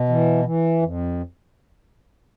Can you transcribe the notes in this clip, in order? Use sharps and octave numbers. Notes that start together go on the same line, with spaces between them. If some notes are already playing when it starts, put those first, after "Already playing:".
Already playing: B2
E3
E3
F2